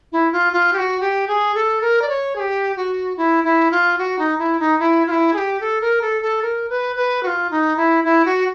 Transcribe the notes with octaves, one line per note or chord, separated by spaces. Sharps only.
E4
F4
F4
G4
F#4
G4
G#4
A4
A#4
D5
C#5
G#4
G4
F#4
E4
E4
F4
F#4
D#4
E4
D#4
E4
F4
E4
G#4
G4
A4
A#4
A4
A4
A#4
B4
B4
F#4
F4
D#4
E4
E4
F#4